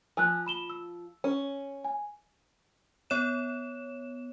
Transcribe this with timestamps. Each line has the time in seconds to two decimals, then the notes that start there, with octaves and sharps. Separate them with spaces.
0.17 F3 G#5 E6 F#6
0.46 B5 E7 G7
0.70 E6
1.24 C#4
1.85 G#5
3.10 B3 C#5 E7